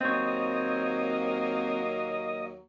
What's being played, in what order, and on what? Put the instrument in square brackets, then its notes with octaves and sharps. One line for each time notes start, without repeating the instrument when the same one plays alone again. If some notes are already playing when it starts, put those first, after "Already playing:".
[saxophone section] D#2 F#3 A#3 [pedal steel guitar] C4 C#5 [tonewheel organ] D#5